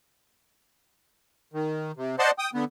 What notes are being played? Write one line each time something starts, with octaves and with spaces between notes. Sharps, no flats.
D#3
C3
C5 D5 D#5 F#5 A5 C6
G5 D#6
D3 B3